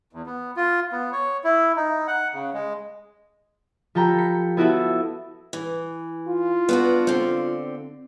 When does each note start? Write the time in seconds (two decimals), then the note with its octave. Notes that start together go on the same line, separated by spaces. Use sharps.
0.13 E2
0.26 B3
0.56 F4
0.92 B3
1.12 C#5
1.44 E4
1.76 D#4
2.07 F#5
2.34 C#3
2.53 G#3
3.95 F3 G4 A4 G5 A#5 B5
4.18 B6 C#7
4.57 B3 E4 F#4 A4 B4 E5
5.53 E3
6.28 F4
6.69 B3 D4 F#4
7.07 D3 C4